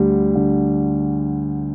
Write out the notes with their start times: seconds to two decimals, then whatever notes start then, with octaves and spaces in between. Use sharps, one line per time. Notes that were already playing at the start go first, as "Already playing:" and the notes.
Already playing: D2 D3 G3
0.35 D3